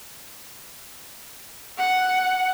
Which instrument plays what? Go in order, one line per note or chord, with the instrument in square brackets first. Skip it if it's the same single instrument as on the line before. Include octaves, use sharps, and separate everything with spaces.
[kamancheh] F#5